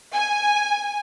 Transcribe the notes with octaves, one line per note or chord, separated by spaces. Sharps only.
G#5